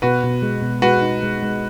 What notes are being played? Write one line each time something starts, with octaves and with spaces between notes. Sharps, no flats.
B2 F#4 B4
B2
G#3
B2
G#3 F#4 B4
D#4
G#3
G#3